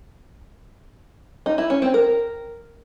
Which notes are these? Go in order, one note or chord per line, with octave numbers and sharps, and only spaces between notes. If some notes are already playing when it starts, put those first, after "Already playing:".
D#4
E4
C#4
C4
A#4